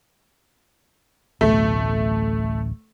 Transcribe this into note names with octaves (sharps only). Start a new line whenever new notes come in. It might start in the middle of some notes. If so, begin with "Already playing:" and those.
D1 A1 B2 A3